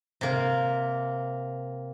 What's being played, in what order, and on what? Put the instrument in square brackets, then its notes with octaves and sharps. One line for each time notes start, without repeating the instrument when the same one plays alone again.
[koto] C3 A#3